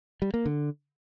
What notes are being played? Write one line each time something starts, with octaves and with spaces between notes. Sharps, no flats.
G3
A#3
D3